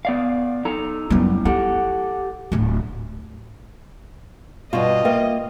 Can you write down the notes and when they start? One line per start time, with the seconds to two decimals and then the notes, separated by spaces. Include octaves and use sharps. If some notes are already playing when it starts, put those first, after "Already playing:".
0.05 B3 D5 F5
0.65 D#4 A4 A#5
1.10 F#2 A2 G3 B3
1.45 E4 G4 A4 F#5
2.52 D1 A2
4.73 G2 B2 F4 D#5
5.05 A#3 B4 E5 G5